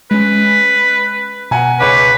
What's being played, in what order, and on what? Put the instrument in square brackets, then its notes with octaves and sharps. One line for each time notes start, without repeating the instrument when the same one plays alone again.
[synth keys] G#3 C#4 [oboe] B4
[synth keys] B2 [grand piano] F#5 G#5 A#5
[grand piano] C#2 C#4 D6 [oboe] B4